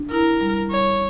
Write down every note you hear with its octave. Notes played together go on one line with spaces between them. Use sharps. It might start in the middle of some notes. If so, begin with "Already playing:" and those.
Already playing: D4
E4 A#4
G3
G3 C#5